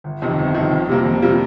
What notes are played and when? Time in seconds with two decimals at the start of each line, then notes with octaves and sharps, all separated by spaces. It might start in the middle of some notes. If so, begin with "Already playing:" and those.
0.04 G1
0.22 F2 C3 D#3
0.39 G1
0.54 F2 C3 D#3
0.71 F2
0.89 C3 G3 A#3
1.06 F2
1.22 C3 G3 A#3